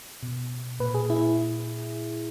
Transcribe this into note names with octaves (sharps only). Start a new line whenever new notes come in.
B2
A#2 B4
G#4
E4